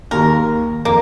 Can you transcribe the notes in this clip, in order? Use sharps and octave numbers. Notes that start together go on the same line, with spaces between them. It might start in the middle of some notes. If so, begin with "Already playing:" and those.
D#2 A#3 A#4
F2 A#3